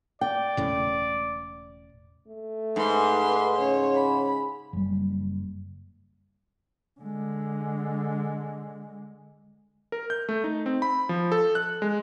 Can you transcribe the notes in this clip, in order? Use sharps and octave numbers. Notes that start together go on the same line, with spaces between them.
D5 G5
E1 A2 C#3
A3
G#2 B4 C6
C#3 C#5
B5
F#1 G3
D3 G#3
A#4
G6
A3
D#4
C4
B5
F3
A4
F#6
G#3